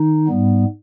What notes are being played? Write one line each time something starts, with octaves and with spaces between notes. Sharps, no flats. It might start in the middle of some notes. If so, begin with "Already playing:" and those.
Already playing: D#3 D#4
G#2 G3 B3